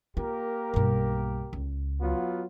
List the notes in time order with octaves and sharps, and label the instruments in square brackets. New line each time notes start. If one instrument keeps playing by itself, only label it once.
[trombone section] A#3 G4 A#4 [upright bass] F4
[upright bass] B1 G2
C#2
[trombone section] F#3 B3 F4